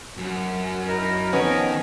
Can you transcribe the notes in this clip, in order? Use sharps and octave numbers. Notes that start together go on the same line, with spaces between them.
F#2
D#4 E4 A#4
D#3 F3 B3 C#4 A4 D#5